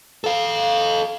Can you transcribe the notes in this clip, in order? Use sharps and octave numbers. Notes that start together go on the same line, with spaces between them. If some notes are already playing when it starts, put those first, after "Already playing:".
A4 F5